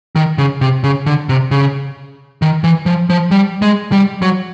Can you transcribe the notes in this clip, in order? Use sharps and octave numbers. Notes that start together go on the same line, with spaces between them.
D#3
C#3
C3
C#3
D3
C3
C#3
D#3
E3
F3
F3
G3
G#3
G3
F#3